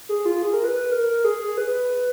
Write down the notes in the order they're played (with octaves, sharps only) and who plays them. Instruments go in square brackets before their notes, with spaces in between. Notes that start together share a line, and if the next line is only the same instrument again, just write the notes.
[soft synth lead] G#4
F4
G#4
A#4
B4
B4
A#4
A#4
G#4
G#4
B4